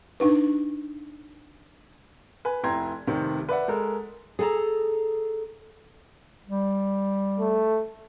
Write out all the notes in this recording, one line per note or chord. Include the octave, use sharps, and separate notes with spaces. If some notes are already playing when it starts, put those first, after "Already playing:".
D4 D#4 B4
B4 G#5
F1 E4 G5 A#5 C6 G#6
F1 C3 D#3
B4 D5 E5 F#5
G#3 A4 A#4
G#4 A4 G#5 A#5
G3
A3